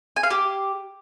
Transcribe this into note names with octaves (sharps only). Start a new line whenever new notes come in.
G#5
F5
G4